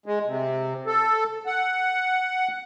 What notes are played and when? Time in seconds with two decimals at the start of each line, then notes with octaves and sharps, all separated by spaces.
0.06 G#3
0.26 C3
0.86 A4
1.46 F#5